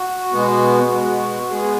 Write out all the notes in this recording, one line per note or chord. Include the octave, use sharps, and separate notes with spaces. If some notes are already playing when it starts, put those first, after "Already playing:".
Already playing: F#4
B2 G#3 B3
B2 G#3 B3
B2 G#3 B3 G#4